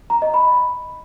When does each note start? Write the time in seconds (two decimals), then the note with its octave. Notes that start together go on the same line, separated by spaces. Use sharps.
0.10 A#5
0.22 D#5
0.34 B5